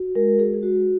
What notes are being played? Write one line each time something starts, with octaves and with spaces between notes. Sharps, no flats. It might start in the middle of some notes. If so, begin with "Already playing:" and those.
Already playing: F#4
G#3 A#4
G#3 G#4
G#4
G#3 F#4